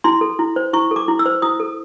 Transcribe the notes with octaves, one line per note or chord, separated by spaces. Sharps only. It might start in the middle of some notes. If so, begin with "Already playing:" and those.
E4 C6
A4
E4
C5
E4 C#6
A4
D6
E4
E6
C5
E4 D#6
A4